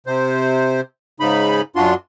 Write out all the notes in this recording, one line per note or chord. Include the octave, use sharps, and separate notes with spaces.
C3 C5
G#2 C#3 D#4 B5
F#2 D4 F4 F#4 C6